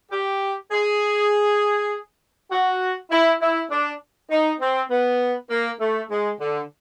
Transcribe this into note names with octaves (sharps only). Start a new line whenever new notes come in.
G4
G#4
F#4
E4
E4
D4
D#4
C4
B3
A#3
A3
G#3
D3